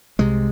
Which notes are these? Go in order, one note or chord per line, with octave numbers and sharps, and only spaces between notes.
C2 C3 G#3